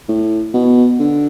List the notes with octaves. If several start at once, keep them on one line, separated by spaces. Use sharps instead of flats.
A2
B2
D3